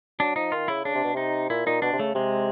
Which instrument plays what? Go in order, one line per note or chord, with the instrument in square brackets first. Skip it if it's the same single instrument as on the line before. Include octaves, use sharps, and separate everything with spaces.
[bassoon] F#3 [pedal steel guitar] D4
[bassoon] F3 [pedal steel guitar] D#4
[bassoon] D#3 [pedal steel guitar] F4
[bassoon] C#3 [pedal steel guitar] E4
[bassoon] C#3 [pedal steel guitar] D4
[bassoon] C3
B2
[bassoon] C3 [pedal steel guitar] D#4
[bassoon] A#2 [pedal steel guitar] E4
[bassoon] A#2 [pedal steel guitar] D#4
[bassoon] B2 [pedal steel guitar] D4
[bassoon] C3
[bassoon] C#3 [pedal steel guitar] A3
[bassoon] C3 [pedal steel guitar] G#3